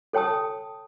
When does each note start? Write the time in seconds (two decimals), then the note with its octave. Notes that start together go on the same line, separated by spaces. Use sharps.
0.13 A4 C#5 G5 A5 D#6